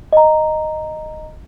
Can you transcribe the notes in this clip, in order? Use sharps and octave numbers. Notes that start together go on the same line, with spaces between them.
D#5 A#5